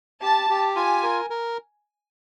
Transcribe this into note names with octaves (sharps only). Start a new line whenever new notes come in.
G4 A5
G4
F4 G#5
A#4
A#4